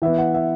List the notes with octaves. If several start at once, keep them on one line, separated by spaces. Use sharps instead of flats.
E3 B3 E5
F#5
E5